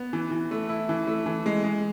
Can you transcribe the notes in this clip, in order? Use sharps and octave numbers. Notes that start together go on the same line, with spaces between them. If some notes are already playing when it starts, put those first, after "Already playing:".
Already playing: B3
E3
E3
A3
E4
E3
A3
E3
G#3
G#3